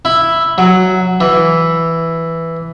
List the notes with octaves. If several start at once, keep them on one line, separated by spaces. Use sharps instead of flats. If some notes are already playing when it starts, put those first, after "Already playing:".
E4
F#3
E3